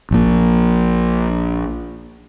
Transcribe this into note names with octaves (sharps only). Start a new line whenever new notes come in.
A#1 A#2